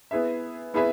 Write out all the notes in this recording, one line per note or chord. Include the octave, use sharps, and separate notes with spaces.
B3 E4 G#4 B4 E5
B3 E4 G#4 B4 E5